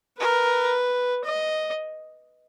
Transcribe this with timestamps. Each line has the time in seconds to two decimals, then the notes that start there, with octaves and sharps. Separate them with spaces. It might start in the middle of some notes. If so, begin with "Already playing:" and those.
0.20 A#4 B4
1.25 D#5